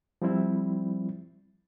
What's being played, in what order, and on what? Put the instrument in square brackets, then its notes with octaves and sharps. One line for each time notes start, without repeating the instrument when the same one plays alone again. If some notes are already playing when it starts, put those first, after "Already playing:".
[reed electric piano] F3 G3 C4 E4